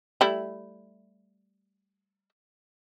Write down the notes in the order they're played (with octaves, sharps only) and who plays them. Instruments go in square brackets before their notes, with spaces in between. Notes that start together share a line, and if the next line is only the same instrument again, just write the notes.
[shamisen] G3 A3 E4